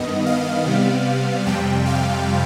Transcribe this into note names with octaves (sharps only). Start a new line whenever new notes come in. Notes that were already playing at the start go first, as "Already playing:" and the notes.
Already playing: G2 D#3 B3 D#5
F5
C3 G3 B3
F2 C3 G3 G5
F5